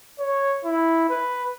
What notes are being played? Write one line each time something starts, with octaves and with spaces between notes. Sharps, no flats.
C#5
E4
B4